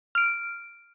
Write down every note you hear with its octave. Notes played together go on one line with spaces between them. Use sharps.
F6 D7